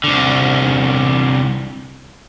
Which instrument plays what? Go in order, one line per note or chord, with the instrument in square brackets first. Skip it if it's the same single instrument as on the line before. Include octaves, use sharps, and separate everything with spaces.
[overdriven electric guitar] C2 D3